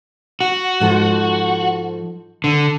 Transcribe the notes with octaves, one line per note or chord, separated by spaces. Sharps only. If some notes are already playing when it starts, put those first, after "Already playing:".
F#4
G#2 F3 A4
D3